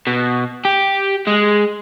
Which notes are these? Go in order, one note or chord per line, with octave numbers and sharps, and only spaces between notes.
B2
G4
G#3